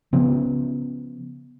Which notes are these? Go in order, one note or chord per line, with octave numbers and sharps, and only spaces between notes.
C#3 F3 B3